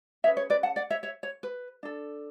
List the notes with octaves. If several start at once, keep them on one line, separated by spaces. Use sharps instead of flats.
C#4 G#4 B4 C#5 E5
C#5
B4 D5
F#5 A5
D5 F#5
C#5 E5
C#5 E5
C#5
B4
D4 A4